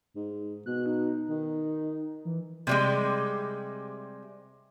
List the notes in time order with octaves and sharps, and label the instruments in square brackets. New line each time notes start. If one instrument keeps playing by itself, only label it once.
[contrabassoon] G#2
[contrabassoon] B2 [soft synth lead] F#6
[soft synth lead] D#4
[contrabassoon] D#3
[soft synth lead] E3
[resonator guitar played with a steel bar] C3 G3 G#3